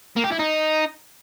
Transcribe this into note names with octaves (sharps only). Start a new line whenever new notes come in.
A#3
G4
E4
D#4